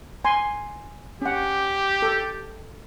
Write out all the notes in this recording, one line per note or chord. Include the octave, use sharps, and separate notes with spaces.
G#5 C6
C#4 G4 F#5
A4